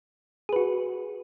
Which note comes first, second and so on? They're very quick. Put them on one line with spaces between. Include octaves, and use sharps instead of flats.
G#4 B4 F#4